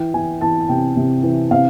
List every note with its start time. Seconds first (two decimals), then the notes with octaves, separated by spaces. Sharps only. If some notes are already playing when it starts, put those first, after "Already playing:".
Already playing: E3 G5
0.14 E3 G#5
0.41 E3 A5
0.69 C3 G5
0.96 C3
1.23 E3
1.51 C3 F5